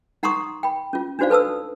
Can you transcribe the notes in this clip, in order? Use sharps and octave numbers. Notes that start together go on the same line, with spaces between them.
D#4 F#5 A#5 C6 C#6 D#6
G5 B5
C#4 F4
D4 D#4 F#4 C5 D5 F5
A4 B4 A5 D#6 E6